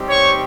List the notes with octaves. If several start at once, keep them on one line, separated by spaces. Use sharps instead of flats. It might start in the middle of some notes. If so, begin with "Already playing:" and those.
Already playing: G3 C4 D#4 G4
C#5 C#6